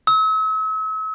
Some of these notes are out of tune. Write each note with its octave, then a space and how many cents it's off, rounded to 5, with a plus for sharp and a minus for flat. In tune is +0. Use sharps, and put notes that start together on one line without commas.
E6 -40